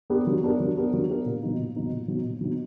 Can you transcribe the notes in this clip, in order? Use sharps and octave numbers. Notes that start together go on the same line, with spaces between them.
B3 D4 G4 A#4
F#3
B3 D4 G4 A#4
F#3
B3 D4 G4 A#4
F#3
B3 D4 G4 A#4
A#2
F#3 B3 D#4
A#2
F#3 B3 D#4
A#2
F#3 B3 D#4
A#2
F#3 B3 D#4